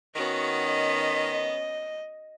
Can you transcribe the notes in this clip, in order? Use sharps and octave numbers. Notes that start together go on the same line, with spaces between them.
D#3 B3 C#4 F#4
D#5